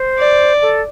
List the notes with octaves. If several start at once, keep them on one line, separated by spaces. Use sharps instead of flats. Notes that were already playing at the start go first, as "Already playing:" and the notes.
Already playing: C5
D5
A4